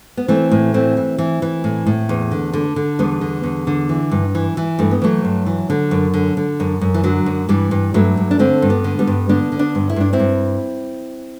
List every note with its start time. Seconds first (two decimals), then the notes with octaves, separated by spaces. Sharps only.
0.17 B3
0.28 E3 A3 C4
0.51 A2
0.74 E3 A3 C4
0.97 E3
1.18 E3
1.42 E3
1.64 A2
1.86 A2
2.09 E2
2.31 D3
2.53 D3
2.76 D3
2.99 E2 G3 B3
3.21 D3
3.44 E2
3.67 D3
3.89 E3
4.11 G2
4.35 E3
4.57 E3
4.79 G2 A3
4.91 B3
5.02 E3 F#3 A3
5.25 G2
5.46 E3
5.70 D3
5.91 F#2
6.14 D3
6.37 D3
6.60 F#2
6.81 F#2
6.94 E3
7.03 D3 F#3
7.26 F#2
7.49 G2 E3 G3
7.71 G2
7.94 G2 F#3 A3
8.17 G2
8.31 D4
8.39 D3 A3 C4
8.62 G2
8.70 G3 B3
8.84 D3
8.99 G3 B3
9.07 G2
9.29 D3 B3 D4
9.52 D3
9.59 B3 D4
9.75 G2
9.90 E4
9.96 G2 D4
10.13 C4 E4
10.19 G2